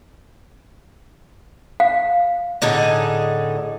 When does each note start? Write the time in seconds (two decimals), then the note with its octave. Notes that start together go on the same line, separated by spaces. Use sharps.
1.80 F5
2.62 A2 D3 D#4 G#4